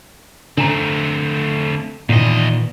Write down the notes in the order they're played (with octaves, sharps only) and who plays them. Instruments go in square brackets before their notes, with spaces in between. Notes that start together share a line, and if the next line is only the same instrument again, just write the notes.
[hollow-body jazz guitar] D3 G#5 A#5 [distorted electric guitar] A3 C4
[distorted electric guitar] E2 D#5 [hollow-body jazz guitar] A#2 D#3 E3